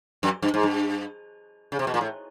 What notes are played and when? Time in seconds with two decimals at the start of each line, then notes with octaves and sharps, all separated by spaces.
0.23 F#2
0.42 G2
0.54 G#2
0.63 G2
1.72 C#3
1.79 C3
1.87 B2
1.94 A#2
2.01 A2